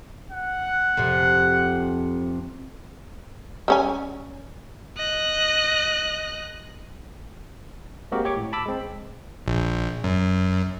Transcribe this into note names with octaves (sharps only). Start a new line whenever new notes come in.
F#5
F2 C3
G3 C#4 G#5
D#5 F#6
G#3 A#3 C4 F#4 G4 A#4
G4 C#5 C#6 D6
A2
A5 B5 D6 E6
G#3 C4
A#1
F#2